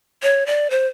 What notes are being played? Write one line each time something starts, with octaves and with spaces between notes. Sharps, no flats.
C#5
D5
C5